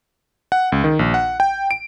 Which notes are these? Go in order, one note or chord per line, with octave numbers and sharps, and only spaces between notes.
F#5
C#2
D#3
A#1
F#5
G5
D7